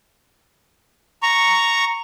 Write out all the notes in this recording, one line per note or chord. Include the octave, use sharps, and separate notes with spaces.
A#5 C#6